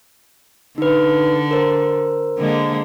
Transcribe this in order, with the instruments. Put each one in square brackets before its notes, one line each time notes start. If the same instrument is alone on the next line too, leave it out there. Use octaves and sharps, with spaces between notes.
[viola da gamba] D3 [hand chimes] D#4 B4
[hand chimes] A#4 C5
[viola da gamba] D3 G#3 A#3